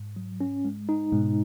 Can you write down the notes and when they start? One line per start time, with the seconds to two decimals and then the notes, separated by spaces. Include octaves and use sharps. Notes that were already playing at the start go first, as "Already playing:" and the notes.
Already playing: G#2
0.16 F#3
0.41 C#4
0.65 G#3
0.89 D#4
1.12 G#2 B2 G#3